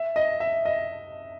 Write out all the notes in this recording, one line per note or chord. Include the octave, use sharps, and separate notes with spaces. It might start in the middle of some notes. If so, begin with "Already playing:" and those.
Already playing: E5
D#5
E5
D#5